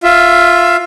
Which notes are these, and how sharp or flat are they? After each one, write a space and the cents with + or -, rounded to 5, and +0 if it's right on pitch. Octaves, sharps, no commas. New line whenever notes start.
F4 +5 E5 +20